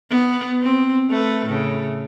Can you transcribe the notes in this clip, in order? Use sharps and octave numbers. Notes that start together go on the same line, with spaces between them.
B3
C4
A3 B4
A2 C#3